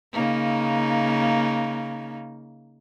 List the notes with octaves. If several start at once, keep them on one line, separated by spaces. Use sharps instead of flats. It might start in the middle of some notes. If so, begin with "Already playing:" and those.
C#3 A#3 D#4